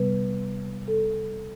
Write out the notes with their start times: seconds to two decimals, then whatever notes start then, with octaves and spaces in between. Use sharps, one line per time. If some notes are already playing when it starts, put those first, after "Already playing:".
Already playing: C3 G3 B3 B4
0.88 A4